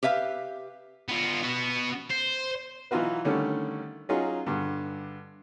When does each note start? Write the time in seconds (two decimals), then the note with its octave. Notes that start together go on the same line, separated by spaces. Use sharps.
0.03 G4 B4 E5 F5
1.09 B3 F4
1.44 B3 F#4
2.10 C5
2.91 E3 F#3 D#4 F4 F#4 B4
3.25 D3 D#3 G3 A3 C#4
4.09 F#3 C#4 D#4 F4 G#4
4.46 G2 D3